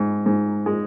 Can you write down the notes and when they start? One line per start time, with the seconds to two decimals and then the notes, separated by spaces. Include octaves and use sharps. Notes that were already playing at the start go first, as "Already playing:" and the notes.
Already playing: G#2
0.26 G#2
0.66 G#3